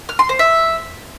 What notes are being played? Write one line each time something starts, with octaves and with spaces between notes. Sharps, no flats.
F6
C6
C5
E5